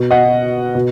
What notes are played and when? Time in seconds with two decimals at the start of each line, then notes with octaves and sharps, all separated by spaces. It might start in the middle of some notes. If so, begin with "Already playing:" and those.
Already playing: B2
0.11 D#5 F#5
0.75 B2